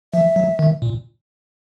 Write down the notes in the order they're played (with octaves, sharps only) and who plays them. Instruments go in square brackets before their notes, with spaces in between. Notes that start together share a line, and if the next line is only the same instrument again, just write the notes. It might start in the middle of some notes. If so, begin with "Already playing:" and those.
[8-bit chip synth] F3 [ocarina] E5
[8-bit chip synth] F#3
D#3
A#2